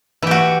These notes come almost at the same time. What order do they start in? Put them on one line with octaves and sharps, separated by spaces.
E3 G4 F#4